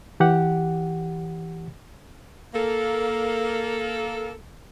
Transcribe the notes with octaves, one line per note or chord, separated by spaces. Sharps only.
E3 G4 F#5
A#3 A4